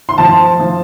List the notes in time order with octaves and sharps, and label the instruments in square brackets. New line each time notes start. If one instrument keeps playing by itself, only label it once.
[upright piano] C6
F3 A5
F3